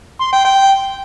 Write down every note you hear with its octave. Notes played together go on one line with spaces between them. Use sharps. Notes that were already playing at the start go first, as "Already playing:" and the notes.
C6
G5
G5